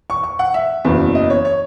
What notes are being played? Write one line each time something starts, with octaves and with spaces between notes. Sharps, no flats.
C#6
C#6
F#5
E5
F#1 E2 B2
D#5
C#5
C#5